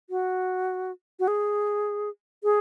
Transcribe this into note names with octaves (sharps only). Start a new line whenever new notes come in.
F#4
F#4
G#4
G#4